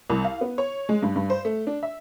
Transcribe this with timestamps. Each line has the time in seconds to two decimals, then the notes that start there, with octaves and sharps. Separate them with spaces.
0.10 C2
0.25 F5
0.41 B3
0.58 C#5
0.89 G#3
1.02 G2
1.16 G2
1.30 C5
1.45 A3
1.67 D4
1.83 E5